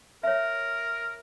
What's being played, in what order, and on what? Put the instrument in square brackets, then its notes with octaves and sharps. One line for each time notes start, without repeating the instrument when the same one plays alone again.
[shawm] A#4 [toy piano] C#5 E5